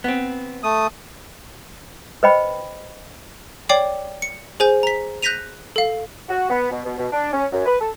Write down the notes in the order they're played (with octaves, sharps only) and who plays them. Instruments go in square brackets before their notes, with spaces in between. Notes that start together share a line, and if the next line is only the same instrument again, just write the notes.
[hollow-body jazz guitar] B3 C4
[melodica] A3 D#6
[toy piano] B4 C5 D#5 G5 B5
[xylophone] C#5 D5 G5 D6 C7 F#7
C#7
G#4 C5 G#5 G6
A#5 B6
F#6 G6 A#6 B6 D#7 F7
A4 F5
[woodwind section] F#4
B3
B2
B2
B2
D4
C#4
F#2
B4
A4